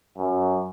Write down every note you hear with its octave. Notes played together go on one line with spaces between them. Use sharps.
F#2